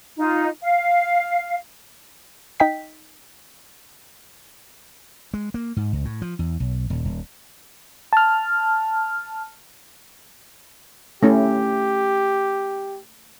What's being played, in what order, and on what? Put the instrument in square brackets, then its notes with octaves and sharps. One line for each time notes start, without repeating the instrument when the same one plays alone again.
[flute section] D#4 F4
F5
[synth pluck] D#4 G5 B6
[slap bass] G#3
A#3
G#2
C#2
A2
F3
E2
B1
D#1
D#1
[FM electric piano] A5 F6
[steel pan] A3 C#4 E4 [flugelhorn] G4